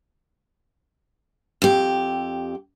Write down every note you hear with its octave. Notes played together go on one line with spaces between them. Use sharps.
F2 G4